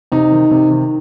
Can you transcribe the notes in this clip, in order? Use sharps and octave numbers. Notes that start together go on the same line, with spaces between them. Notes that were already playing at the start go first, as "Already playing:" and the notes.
C3 D#4
D#3
C3
D#3